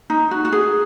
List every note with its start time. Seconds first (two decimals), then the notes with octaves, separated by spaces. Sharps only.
0.10 D#4
0.31 F#4
0.45 F#4
0.52 G#4